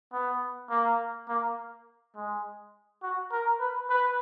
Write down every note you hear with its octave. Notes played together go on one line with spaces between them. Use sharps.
B3
A#3
A#3
G#3
F#4
A#4
B4
B4